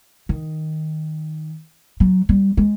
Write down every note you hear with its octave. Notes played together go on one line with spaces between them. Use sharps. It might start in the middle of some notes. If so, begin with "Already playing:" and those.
D#3
F#3
G3
G#3